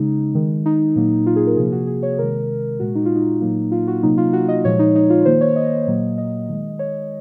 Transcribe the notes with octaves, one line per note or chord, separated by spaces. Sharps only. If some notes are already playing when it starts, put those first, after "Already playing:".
Already playing: C#3 G#3 D#4
D#3 G#3
D#4
A#2 F#3 A#3
F4
G#4
A#4
C3 F3 A#3 G#4
F#4
G#4
C#5
C3 D#3 G#3 A#4
A#2 G#3 F#4
D#4
F4
D#4
A#2 F#3 A#3
F4
F#4
C3 F#3 A#3 D#4
F4
F#4
D#5
A#2 F3 G#3 C#5
D#4
D#4
F4
D#3 A#3 C5
C#5
D#5
A#2 F#3 A#3
D#5
D#3 G#3
C#5